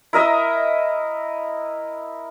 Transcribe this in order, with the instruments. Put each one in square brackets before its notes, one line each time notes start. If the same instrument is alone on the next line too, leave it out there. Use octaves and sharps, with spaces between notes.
[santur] E4 A#4 D#5 E5